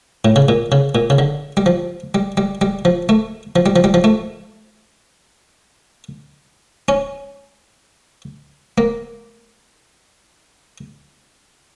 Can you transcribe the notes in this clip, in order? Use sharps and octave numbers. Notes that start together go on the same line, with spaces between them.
A2
C#3
A#2
C#3
A#2
C#3
D3
G3
F3
G3
G3
G3
F3
A3
F3
G3
F3
G3
F3
A3
C#4
A#3